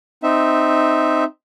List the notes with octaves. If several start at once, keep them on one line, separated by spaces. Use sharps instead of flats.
C4 D#4 E5